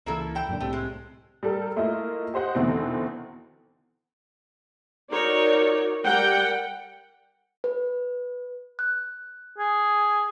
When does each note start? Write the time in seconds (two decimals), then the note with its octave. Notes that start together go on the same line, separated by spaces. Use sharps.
0.06 C#2 E3 A#3 E4 A4
0.35 E4 G5
0.48 F#2 A#2 D3
0.60 C2 A2 C3 A3
0.73 G#3
1.43 G3 G4 A4 A#4
1.76 A3 A#3 E4 F4 D#5
2.34 G4 C5 D#5 F#5
2.55 E2 B2 D3 D#3 A3 C4
5.12 D#4 F#4 A#4 C#5 D5
6.05 G3 A#4 F#5 G5
7.64 B4
8.79 F#6
9.58 G#4